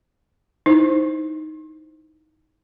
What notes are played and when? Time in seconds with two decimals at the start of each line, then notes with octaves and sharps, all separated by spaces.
0.66 D#4 E4 C5